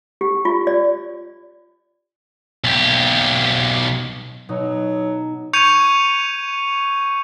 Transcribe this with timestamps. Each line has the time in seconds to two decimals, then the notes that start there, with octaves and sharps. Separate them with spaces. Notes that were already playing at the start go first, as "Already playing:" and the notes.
0.21 G4
0.45 F4
0.67 D5
2.64 B1 G4
4.49 B2 F#3 D#4
5.53 C#6 G6 G#6 C#7 D#7 F7